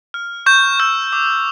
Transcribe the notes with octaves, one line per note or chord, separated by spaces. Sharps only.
F6
C#6 G6
E6 G6
D6